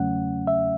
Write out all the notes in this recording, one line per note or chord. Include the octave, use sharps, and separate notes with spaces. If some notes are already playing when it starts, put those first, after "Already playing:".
Already playing: E2 C#3 F#3 A3 C#4 F#5
E5